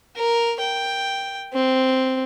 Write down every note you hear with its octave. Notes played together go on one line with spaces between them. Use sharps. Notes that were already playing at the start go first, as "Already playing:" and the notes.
A#4
G5
C4